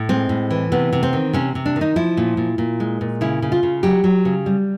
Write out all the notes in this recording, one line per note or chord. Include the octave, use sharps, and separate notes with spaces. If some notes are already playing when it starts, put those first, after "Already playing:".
Already playing: A2
G#3 C4
A2
E3
C3 B3
C3
C4
D#3
C3 C#4
C3
D4
D#3
D#4
F3 E4
A#2
A#2
A#2
G#3
A#2
C#3 E4
C#3
F4
C#3
F#3 G4
F#3
C#3
G3